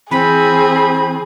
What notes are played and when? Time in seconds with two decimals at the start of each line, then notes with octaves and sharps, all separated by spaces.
0.11 E3 C4 G#4 B5